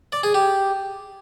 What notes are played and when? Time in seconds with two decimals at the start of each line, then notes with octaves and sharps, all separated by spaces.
0.12 D5
0.23 G#4
0.34 G4